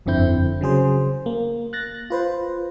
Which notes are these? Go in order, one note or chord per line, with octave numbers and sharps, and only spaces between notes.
G1 F2 D3 C4 E4 G6
C#3 F#3 G#4 C5
A#3
F#6 A6 A#6
F4 B4 C5